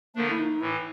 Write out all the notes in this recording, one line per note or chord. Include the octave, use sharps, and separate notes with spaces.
D3 F3 A3 A#3 D4
E4
D#4
A2 E3 E4